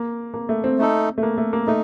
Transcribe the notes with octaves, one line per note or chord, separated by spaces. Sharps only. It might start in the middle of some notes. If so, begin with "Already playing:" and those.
Already playing: A#3
A#3
A3
C4
A3 D#4 A4
A3
A#3
A3
A#3
A3 D#4